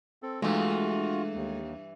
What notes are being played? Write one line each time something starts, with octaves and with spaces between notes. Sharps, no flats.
C4 A4
G2 E3 G#3 A3 F4 F#4
D#2